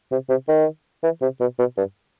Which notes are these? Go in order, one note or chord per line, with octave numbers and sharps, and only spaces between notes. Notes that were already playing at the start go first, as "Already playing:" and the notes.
C3
C3
D#3
E3
C3
B2
B2
G2